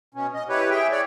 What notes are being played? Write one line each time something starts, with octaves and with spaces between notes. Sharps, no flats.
B2 C#4
D#5
E4 G4 B4 C#5
G#4 E5 G5
C#5 D5